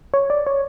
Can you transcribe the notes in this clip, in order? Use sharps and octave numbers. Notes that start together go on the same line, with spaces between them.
C#5
D5
C#5